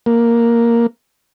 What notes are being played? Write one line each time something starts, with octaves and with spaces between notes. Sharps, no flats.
A#3